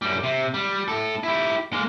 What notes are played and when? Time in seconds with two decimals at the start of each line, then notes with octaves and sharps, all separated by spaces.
0.02 F#2 G3
0.23 C3
0.54 G3
0.88 A2 A4
1.23 E4 G4
1.73 G#3 A#3